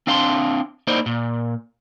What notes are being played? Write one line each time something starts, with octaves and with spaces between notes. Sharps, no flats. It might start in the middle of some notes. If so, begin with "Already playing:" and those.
C4 D4 F5 A5 A#5 C6
A#3 D#4 E4 C5 D5
A#2